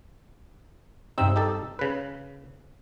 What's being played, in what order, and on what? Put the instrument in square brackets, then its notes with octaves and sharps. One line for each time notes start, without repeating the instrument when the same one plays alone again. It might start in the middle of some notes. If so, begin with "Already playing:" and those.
[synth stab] G2 E6 [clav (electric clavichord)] C3 C4 D#4
[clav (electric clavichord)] D#4 G4 A4
C#3 B4